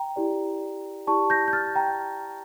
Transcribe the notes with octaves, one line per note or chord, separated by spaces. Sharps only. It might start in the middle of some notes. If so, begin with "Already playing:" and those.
Already playing: G5 A#5
E4 G4 D5
E4 G4 D5 A5 C#6
G6 A#6
G6
F6 A6
G5 A#5